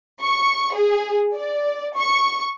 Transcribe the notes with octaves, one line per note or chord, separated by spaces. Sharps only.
C#6
G#4
D5
C#6